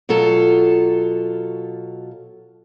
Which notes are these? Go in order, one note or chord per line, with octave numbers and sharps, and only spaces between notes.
B2 F#3 F4 A4